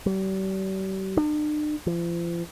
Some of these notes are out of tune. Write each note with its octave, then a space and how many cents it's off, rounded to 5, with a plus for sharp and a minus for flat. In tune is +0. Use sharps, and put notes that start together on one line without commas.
G3 -40
D4 +45
F3 -40